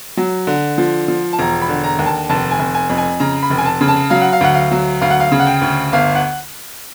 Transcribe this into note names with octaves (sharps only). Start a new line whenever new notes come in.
F#3
D3
F3
F3
A5
E1 A#5
B5
D3
A#5
D#2
A5
F1 A5
G#5
F1
G#5
F2
G#5
C#3 A#5
B5
F1
G#5
A5
C#3
A5
F#3 F5
F#5
F5
D2 F#5
F5
F#3
D2 F5
F#5
F5
C#3
F#5
G5
D2
G1 F5
F#5